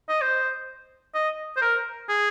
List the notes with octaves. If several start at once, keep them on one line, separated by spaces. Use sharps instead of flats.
D#5
C5
D#5
C5
A#4
G#4